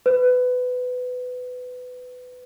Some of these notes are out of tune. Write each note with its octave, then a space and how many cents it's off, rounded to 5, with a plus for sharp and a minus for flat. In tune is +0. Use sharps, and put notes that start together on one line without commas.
B4 +20